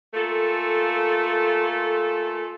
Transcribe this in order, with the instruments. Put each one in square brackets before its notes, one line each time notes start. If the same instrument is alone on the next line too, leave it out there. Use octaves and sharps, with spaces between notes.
[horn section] A3 A#3 F4 A4 G#5